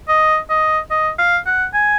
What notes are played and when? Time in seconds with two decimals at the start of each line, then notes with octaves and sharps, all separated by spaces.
0.08 D#5
0.50 D#5
0.91 D#5
1.19 F5
1.46 F#5
1.74 G#5